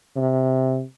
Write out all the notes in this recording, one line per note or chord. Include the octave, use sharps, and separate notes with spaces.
C3